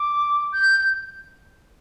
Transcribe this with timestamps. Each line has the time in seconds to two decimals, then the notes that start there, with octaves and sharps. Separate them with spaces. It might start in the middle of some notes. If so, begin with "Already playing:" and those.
Already playing: D6
0.52 G6